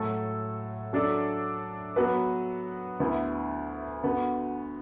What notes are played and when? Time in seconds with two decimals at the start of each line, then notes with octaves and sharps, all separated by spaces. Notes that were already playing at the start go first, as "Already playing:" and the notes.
Already playing: A2 F#3 A3 F#4 A4
0.93 F#3 D4 A4 D5
1.96 F#3 B3 F#4 B4
3.00 D2 D3 B3 E4
4.04 D3 B3 F#4